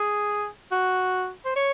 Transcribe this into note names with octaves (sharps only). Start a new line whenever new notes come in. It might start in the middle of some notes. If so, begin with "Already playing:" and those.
Already playing: G#4
F#4
C5
C#5